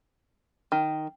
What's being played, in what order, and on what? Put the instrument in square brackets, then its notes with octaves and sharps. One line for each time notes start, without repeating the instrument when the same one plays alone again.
[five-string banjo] D#3